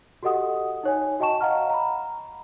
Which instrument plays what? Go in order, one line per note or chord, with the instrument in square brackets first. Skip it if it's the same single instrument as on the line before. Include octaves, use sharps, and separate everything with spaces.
[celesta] F#4 G4 A4 D#5 F#5 D#6
D#4 C#5 G#5
F#4 D#5 G5 A5 C#6 E7
D#5 F5 F#5 A#5 F6
A#5 B5